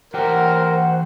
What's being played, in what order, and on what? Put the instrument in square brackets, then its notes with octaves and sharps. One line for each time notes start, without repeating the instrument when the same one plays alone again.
[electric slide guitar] E3 G4 G5 [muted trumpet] A#4 [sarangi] C5 [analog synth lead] F#5